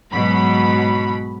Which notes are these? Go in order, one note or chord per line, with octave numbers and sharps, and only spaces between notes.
G#2 B2 F#3 B5